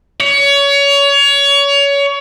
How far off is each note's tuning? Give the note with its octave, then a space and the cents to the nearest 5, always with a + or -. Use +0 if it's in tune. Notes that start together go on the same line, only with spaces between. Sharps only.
C#5 +25